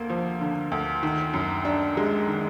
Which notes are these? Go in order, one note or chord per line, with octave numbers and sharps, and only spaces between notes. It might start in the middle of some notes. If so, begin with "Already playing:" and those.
Already playing: D2 A#3
F3
D3
D2
D#3
F#2
D4
G#3
D#3